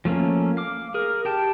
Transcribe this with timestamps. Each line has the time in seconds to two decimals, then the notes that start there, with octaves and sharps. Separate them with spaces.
0.05 F3 A3 A#3 C#4
0.57 F5 D6
0.94 G#4 A#4
1.25 G4 G5 A5